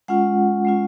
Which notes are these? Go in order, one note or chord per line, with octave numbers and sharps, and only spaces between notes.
G#3 C#4 F4 F#5
G#3 C#4 F4